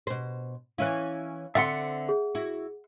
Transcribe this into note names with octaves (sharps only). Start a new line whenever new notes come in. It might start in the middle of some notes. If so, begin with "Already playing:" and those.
B2 C5
E3 C#4 E4 F5 F#6
D3 C4 E5 F#5 C6 A6 B6 C#7
G#4
E4 F#4